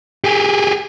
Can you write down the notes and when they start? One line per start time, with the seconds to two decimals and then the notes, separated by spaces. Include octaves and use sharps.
0.24 G4 G#4